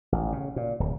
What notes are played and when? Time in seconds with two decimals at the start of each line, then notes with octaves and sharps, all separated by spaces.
0.12 A1
0.32 C#3
0.56 A#2
0.80 D1